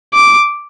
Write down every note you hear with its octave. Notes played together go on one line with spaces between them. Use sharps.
D6